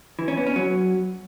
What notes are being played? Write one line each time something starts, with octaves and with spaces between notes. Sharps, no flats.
E3
C#4
B3
C#4
F#3